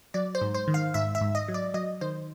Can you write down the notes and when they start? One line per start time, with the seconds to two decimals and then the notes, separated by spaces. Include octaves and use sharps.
0.14 F#3 D5
0.35 C5
0.42 G#2
0.54 C5
0.68 D#3
0.74 F5
0.94 G#2 E5
1.15 E5
1.21 G#2
1.35 D#5
1.48 F#3
1.54 D5
1.74 F#3 D#5
2.01 D#3 C5